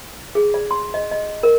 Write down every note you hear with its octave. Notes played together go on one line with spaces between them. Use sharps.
G#4
D5
C6
D#5
D#5
A#4